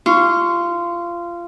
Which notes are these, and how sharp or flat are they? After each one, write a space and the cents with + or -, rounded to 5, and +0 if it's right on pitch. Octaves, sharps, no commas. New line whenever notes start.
F4 -20 C#6 +0